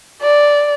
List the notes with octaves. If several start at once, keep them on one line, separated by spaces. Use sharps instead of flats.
D5